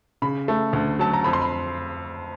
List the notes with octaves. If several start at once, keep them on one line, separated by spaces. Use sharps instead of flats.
C#3 B5
A3
D2
F#3 A5
A#5
F2 B5
C6
B5